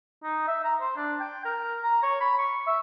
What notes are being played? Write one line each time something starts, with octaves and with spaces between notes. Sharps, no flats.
D#4
E5
A#5
C5
D4
G5
A#4
A#5
C#5
B5
C#6
E5